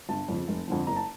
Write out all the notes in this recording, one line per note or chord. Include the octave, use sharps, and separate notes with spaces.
G1 A5
F2 C#3 F3
F1
F2 D3 F3
F#1 A#5
A5